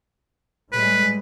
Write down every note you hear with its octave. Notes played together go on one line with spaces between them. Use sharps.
A2 G3 G#3 B4